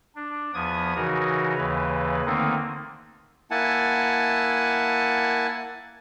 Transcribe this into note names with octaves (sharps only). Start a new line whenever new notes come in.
D4
E2 F3 B3 D#6 G#6
C#3 E3 D#4 F#4 A#4
D#2 C#3 E3 B4
D3 D#3 A3 A#3 C4 D#4
A#3 E4 F#5 G#5 A5